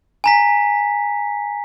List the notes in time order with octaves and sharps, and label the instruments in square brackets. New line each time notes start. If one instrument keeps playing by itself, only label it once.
[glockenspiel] G#5 A#5 B6